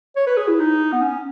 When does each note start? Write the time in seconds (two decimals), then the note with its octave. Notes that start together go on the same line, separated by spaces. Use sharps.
0.16 C#5
0.27 B4
0.37 G#4
0.48 E4
0.59 D#4
0.92 B3
1.02 C#4